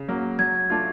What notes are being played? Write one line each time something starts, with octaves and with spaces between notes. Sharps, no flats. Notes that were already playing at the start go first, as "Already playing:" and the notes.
Already playing: C#3
F#3 A#3
F#3 G#6
A3 D4 F4